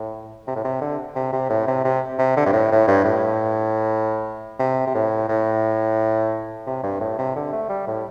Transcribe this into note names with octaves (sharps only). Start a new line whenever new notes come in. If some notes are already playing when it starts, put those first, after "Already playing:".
Already playing: A2
C3
A2
C3
D3
C3
C3
A2
C3
C3
C3
D3
G2
A2
A2
G2
A2
C3
C3
A2
A2
C3
G2
A2
C3
D3
A3
G3
A2